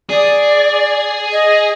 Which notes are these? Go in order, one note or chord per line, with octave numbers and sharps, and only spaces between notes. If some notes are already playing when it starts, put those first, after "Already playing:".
G#4 D5
D#5